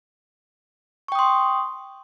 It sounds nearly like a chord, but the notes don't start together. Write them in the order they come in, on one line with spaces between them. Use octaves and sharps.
C#6 G5 D#6 C6